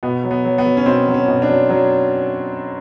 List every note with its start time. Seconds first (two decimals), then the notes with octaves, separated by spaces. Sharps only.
0.03 B2 B3
0.24 F#3
0.31 B3
0.45 F#3
0.58 B3
0.65 F#3
0.77 C#4
0.86 B2 C4
1.07 F#3
1.14 C#4
1.28 B2
1.42 D4
1.49 F#3
1.70 F#3